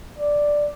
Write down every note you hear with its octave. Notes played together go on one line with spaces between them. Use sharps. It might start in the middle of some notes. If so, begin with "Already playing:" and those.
D5